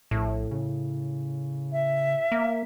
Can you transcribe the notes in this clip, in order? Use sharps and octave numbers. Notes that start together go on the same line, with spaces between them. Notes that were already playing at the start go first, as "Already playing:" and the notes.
A#1 A2
C#3
E5
A#3